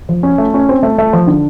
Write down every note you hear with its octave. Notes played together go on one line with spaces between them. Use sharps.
F3
C#4
A3
C#4
C4
A3
A3
F3
D3